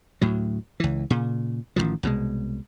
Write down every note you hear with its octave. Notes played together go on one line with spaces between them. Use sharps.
D2 A2 F#3
C#2 E3
A#2 C#3
A1 G#2 D#3 F3
C2 B2 F#3 G#3